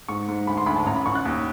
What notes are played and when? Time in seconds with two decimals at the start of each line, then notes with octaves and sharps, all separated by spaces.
0.08 G#2 C#6
0.28 G#2
0.47 D2 B5
0.57 C6
0.66 D2 B5
0.76 A5
0.86 A1 A#5
0.96 B5
1.06 A1 C#6
1.15 F#6
1.25 D#2